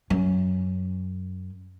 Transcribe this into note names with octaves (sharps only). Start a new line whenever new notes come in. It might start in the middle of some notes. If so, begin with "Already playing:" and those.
F#2